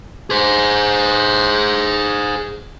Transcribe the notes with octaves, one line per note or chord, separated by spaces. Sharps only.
G#4 C5